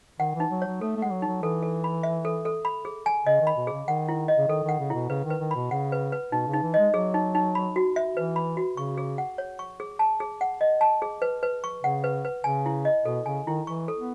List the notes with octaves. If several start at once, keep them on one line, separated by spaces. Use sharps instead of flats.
D#3 F#5
E3
D#4
F#3
C#5
F#3
A3 A4
A3
G#3 F#5
F#3
F#3 D#4
E3 A4
A4
B5
E5
A4
A4
B5
G#4
G#5
C#3 D#5
D#3
B5
B2
C#3 G#4
D#3 F#5
E4
D#5
C#3
D#3 A4
D#3 F#5
C#3
B2 E4
C#3 B4
D#3
B4
D#3
B2 B5
C#3 F#5
B4
B4
B2 D#4
C#3
D#4
E3
G#3 D#5
F#3 G#4
D#4
D#4
B5
F#4
E5
E3 B4
B5
F#4
C#3 C#6
G#4
F#5
C#5
C#6
G#4
A5
G#4
F#5
D#5
A5
G#4
B4
B4
C#6
C#3 F#5
B4
B4
C#3 G#5
E4
D#5
B2 A4
C#3 G#5
D#3 E4
E3 C#6
A4
B3